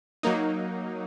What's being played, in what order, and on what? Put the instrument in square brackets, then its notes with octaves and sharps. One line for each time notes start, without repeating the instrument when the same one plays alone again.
[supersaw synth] F#3 A#3 D#4